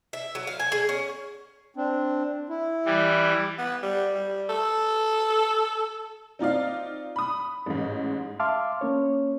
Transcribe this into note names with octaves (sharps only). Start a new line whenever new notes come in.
E5
F#3
F5
G#5
G#4
C#4
C4 D4
E4
E3 G3
B3
G3
G3
A4
C4 D#4 F4 D5 F5
B5 D#6
A1 G#2
E5 F5 A5 C6 D6 F6
A#3 C#4 C#5